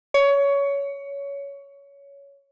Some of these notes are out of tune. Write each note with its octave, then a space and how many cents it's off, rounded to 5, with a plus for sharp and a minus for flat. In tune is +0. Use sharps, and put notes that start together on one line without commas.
C#5 +15